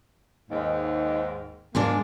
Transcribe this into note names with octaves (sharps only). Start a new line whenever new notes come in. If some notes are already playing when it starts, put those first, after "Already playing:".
D#2 G#2
G#2 G#3 A#3 D4